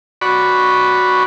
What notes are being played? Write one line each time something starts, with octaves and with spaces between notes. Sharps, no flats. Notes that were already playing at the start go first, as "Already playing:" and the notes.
F#4 D5 B5 C#6